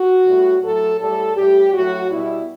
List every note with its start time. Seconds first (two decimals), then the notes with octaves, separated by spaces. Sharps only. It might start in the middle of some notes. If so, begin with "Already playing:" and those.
Already playing: F#4
0.25 A2 G3
0.62 A2 F#3 A4
1.00 A2 G3 A4
1.36 A2 G3 G4
1.73 A2 F#3 F#4
2.11 B2 G3 E4